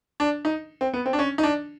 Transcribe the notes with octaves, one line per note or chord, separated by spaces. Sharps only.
D4
D#4
C4
B3
C4
D4
C#4
D#4
D4